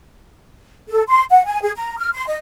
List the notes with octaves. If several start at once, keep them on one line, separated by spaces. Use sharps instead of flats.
A4
C6
F#5
G#5
G#4
A#5
F6
C6
D#5